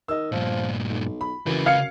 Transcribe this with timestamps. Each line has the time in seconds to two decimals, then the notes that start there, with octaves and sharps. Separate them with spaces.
0.08 D#3 D#5 E6
0.32 G2 A#2 F3
0.90 B1
1.21 B5
1.46 F#2 C#3 E3 B4
1.66 F#2 F5 G#6 C#7